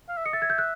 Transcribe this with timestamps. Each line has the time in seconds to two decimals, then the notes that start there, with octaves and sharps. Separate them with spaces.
0.09 F5
0.17 E5
0.26 D#5 C#7
0.33 E5 A6
0.42 G#6
0.50 G6
0.58 F#6